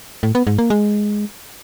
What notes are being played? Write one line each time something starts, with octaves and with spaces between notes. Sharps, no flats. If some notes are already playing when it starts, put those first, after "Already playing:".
A2
B3
G#2
A#3
G#3